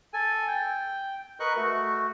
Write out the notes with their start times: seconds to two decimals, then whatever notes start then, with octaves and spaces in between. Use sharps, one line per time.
0.13 A4 G#5
0.48 G5
1.40 A#4 B4 D#5 C#6 F#6
1.57 A3 F#4